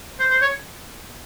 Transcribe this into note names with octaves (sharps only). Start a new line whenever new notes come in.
C5
C5
C#5